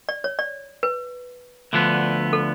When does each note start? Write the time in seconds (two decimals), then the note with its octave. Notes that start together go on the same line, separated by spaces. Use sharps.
0.09 D5
0.24 C#5
0.39 D5
0.83 B4
1.73 D2 D3 F3 B3
2.33 A4